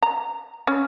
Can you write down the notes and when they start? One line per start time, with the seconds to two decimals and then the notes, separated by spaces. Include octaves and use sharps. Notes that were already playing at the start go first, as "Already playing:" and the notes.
0.02 A#5
0.67 C#4